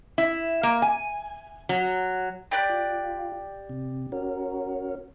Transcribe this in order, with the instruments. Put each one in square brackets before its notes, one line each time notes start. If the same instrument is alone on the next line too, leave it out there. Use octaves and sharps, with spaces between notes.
[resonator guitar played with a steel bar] E4
A#3
G#5
F#3
[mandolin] G4 D5 F#6 [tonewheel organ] A#5 B5
[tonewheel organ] F4
C3
C#4 F#4 A#4